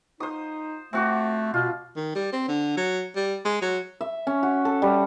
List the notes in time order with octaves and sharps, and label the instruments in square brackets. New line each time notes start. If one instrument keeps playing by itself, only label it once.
[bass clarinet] D#4 [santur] C5 D#6
[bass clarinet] A3 [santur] C4 F#4 D6
[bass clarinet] B2 [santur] F4
[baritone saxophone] D#3
G3
C4
D3
F#3
G3
G#3
F#3
[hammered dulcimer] E5
C#4
F#4
A4
G3